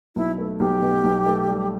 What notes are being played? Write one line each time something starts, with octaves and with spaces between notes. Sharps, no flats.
B1 E4
A3
B1 G4
B2
B1
A3
G3